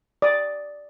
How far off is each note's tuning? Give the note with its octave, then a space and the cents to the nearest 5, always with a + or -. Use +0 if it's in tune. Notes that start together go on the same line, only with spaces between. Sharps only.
D5 +0 D#6 +0